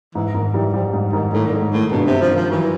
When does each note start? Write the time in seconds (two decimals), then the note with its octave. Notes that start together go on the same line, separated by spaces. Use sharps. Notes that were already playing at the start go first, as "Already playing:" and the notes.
0.15 G#2 E3
0.34 G#2 D#3
0.54 E3 G3
0.74 F3 G3
0.93 G#2
1.13 G#2 D#3
1.32 A2 D#3
1.47 A#2
1.52 A2 G#3
1.72 A2 D#3
1.92 G2 B2
2.06 G2 C3
2.21 F3
2.31 D#3
2.36 F3
2.50 E3 F#3